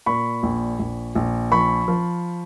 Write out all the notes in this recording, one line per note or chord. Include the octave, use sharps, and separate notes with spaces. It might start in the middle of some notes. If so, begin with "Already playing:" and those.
A#2 B5 C#6
A#1
A#1
A#1
F3 B5 C#6
F3